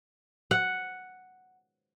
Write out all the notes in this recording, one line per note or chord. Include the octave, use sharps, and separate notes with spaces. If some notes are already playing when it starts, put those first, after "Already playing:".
F#5